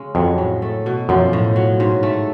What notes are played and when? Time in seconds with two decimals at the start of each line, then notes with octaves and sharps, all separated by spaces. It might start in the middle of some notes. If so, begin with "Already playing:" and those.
Already playing: C#3 G#3 C#4
0.15 F2 F#3
0.38 A2
0.62 A3
0.86 B2
1.09 F#2 F3
1.33 A2
1.56 F#3
1.80 G#2
2.03 A3